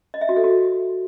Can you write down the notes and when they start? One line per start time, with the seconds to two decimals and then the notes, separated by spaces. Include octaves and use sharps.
0.14 D#5
0.21 E5
0.29 F#4
0.36 A4
0.44 F#4